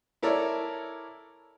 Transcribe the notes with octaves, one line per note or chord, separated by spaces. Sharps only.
E4 A4 A#4 C#5 D5